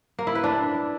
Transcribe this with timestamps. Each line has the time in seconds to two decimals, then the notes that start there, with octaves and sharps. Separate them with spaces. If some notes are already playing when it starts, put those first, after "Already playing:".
0.19 A#3
0.27 E4
0.35 B4
0.44 D4